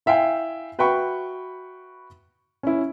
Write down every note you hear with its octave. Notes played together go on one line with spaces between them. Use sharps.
E4 E5 F5 G5 G#5
F#4 B4 E5 G5 B5 C#6
C#4 E4